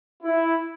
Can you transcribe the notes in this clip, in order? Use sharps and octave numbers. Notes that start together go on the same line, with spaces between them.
E4